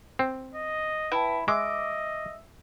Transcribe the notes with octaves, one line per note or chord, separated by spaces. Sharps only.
C4
D#5
E4 B4 G5 A5
G#3 D#5 E5 D6 E6